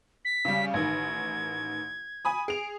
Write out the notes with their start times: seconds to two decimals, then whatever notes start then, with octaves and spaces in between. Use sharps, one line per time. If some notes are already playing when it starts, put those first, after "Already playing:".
0.25 B6
0.45 C#3 G3
0.74 A1 D#3 G#6
2.25 G#5 B5 D#6
2.48 G#4 D7 F7